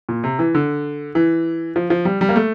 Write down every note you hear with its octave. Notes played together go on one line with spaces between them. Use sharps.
A#2
C3
E3
D3
E3
F3
F3
G3
G3
A#3
A3